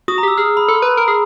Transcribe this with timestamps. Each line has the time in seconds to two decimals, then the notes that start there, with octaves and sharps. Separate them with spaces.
0.08 F#4 D#6
0.18 A#5
0.23 G4 E6
0.37 G#4 F6
0.57 B5
0.68 A4 C6
0.82 B4 B5
0.97 A#4 A#5
1.08 G#4